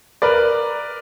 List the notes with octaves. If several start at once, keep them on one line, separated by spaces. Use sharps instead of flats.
A#4 B4 D5